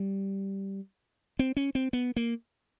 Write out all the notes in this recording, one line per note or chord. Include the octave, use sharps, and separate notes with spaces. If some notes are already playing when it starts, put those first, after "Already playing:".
Already playing: G3
C4
C#4
C4
B3
A#3